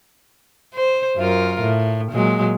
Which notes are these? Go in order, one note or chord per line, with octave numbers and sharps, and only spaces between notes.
C5
F#2 F4 A#4
A2
A#2 F#3 G#3